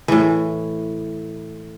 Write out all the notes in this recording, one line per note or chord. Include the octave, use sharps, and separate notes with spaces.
A2 E3